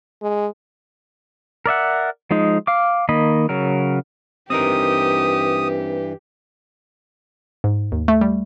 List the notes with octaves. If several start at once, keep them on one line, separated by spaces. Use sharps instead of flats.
G#3
A#4 D5 E5 F#5
F3 G#3 D#4
F5 D6
D#3 A#3 D#5 B5
C#3 F#3 A#4
G2 E3 C4 D#4 G4 A#4 D#6
G#2
D#2
A3
G3